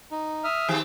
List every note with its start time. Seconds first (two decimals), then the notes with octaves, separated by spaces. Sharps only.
0.11 D#4
0.44 E5 D#6 F6
0.69 D#3 C4 G4 G#4